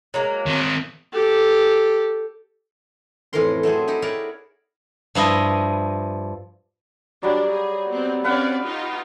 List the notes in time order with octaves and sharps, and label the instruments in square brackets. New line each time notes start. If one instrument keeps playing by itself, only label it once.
[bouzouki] F#3 G#3 A#3
[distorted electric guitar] D#3 C4
[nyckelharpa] G4 A4
[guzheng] F2 A2 E3 C#4 A#4 C6
F#3 A3 C4 G#4
D#4 E4 G4 G#4
E4 A#4 C#5 D5 F#5
G2 F3 E4 D#5
[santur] F#3 G3 [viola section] D4
[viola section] G#4
B3 C4
[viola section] C4 C#4 D5 [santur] B4 F5 F#5
[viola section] D#4 F4 G4